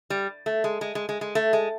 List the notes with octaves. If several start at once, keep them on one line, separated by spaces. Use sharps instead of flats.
G3
A3
G#3
G#3
G#3
G#3
G#3
A3
G#3